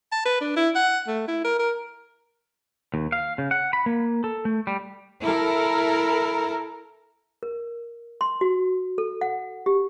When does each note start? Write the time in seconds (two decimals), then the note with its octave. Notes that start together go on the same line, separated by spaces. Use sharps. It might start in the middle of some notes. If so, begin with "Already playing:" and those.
0.12 A5
0.25 B4
0.41 D4
0.56 E4
0.75 F#5
1.07 A3
1.28 E4
1.44 A#4
1.59 A#4
2.94 D#2
3.12 F5
3.38 C#3
3.51 F#5
3.73 B5
3.86 A#3
4.24 A4
4.45 A3
4.67 G3
5.21 E4 A4 A#4
7.43 A#4
8.21 C6
8.41 F#4
8.98 A4
9.21 F#5
9.66 G4